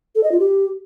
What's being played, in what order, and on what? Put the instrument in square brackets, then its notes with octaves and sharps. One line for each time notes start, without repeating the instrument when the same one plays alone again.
[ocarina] A4
D#5
F4
G4